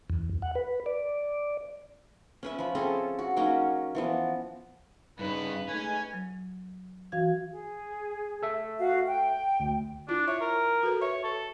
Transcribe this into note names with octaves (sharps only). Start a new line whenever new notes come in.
E2
F#5
B4
D5
C#4 B4 E5
F3 B5
C4 C#4 G#4 A4
F#4
F#3 A#3 C#4 D#4
E3 F3 B3
G2 C#3 B3 D4 D#4 B4
G#3 A3 C#4 D#4 G#5
F#3
E3 F#4 F5 G#6
G#4
A4 E5
F#4 F5
G5
D2
D4 E4 F4
C#5 E5
A#4
F#4 A4 B4
C#5 E5
A4